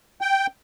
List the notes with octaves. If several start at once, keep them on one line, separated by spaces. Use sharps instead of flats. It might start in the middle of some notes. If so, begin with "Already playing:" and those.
G5